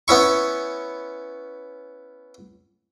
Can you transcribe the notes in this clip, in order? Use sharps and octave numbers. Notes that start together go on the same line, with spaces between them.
B3 C#4 E4 C#6